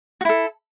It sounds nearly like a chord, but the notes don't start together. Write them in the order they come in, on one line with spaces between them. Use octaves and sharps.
F#4 E4 A4